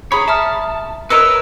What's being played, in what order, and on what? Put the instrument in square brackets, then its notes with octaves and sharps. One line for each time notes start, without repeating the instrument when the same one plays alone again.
[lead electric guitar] G#4 C#5 [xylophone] A#5 [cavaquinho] B5
[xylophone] E5 D#6 F6 [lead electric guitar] A5
[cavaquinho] A#4 C#5 D#5 [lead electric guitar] B4 [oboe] E6 [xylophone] C#7